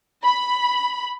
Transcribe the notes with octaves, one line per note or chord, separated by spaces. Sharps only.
B5